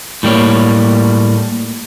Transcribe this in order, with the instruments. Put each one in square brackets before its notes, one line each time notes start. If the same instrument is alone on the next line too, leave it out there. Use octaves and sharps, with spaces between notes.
[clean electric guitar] A2 G3 A#3 C#5